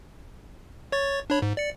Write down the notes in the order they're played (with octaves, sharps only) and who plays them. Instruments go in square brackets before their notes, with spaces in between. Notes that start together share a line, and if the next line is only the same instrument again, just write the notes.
[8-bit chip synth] C#5 C#6 A6
D4 C#5 B5
G#2
D5 C#7